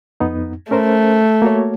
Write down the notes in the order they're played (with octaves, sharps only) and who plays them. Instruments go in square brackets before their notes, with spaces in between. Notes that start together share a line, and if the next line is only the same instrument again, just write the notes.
[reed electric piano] F2 B3 D#4
[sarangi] A3 [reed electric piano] C#4 A#4 C5
[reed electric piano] A#3 F#4 C#5